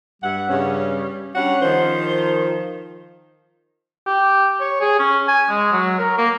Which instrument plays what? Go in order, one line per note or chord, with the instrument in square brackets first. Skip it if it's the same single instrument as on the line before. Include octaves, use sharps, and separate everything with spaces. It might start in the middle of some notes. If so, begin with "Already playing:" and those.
[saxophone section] G2 E5 F#5 [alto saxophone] G3
[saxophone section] G2 C#3 C#4
[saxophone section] G3 D4 F#5 [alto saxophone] C#4
[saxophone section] D#3 F3 [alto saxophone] C5
[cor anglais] G4
C#5
G#4
C#4
G#5
G#3
F#3
A#4
A#3